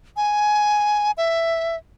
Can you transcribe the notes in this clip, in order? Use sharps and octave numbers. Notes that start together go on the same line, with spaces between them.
G#5
E5